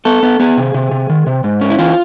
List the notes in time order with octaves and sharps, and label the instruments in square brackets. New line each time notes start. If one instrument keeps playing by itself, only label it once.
[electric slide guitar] B3 A4
B3
B3 G#4
C3
C3
C3
D#3
C3
G#2
C#4
E4
E3 F4